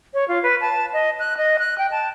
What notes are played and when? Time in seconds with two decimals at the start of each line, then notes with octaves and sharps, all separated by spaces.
0.14 C#5
0.28 F4
0.43 B4
0.61 A5
0.93 D#5
1.19 F#6
1.37 D#5
1.59 F#6
1.78 G5
1.91 A5